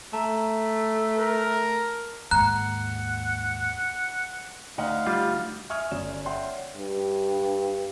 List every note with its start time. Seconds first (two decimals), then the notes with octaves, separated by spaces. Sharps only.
0.13 A3 A5 A#5
1.19 A#4
2.31 D#2 G#2 F#5 A#5 F#6
4.78 D2 D#4 D#5 F5 F#5
5.06 G3 F4
5.70 E5 G#5 C#6 D#6 F6 G#6
5.91 G1 C#4 D5 E7
6.25 C#5 D5 E5 F#5 G5 C6
6.76 G2